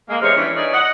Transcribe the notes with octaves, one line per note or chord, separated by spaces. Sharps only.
G#3 A#3
E2 C3 G#3 A#4 C5 C#5
E3 G3 A#3 C#4 D4 E4
E3 C#4 D#4 G#4 C#5 D5
D#5 F#5